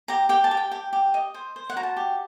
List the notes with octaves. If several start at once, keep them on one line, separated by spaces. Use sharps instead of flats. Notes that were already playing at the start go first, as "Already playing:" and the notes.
G4 A#5
G4 G5
A5
G4
G5
G4
G4
D#5
C5
C5
F#5
F#4 A#5
A5
G4